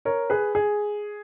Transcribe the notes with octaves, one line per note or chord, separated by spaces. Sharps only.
A#4 C#5
G#4 B4
G#4